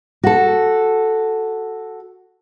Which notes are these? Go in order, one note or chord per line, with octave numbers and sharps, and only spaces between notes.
F#4 A4